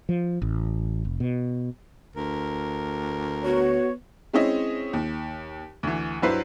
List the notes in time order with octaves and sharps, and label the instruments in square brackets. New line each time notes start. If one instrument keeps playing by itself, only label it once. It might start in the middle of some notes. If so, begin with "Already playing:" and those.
[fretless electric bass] F3
A1
F1
B2
[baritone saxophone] D2 [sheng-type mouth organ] A#4
[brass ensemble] B3 C#5 [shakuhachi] F#4
[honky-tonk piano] G#3 C4 C#4 E4 D#5
D#2
D2 E3
G2 F#3 E4 B4 C5 C7